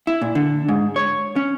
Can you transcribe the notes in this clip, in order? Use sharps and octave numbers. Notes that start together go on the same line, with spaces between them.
E4
A#2
D3
G#2
C#5
C#4